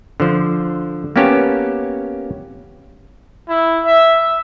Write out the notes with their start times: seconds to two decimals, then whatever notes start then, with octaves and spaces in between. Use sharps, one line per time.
0.20 D3 F3 C5
1.16 A#3 B3 C#4 G4 C#5 A5
3.49 E4
3.85 E5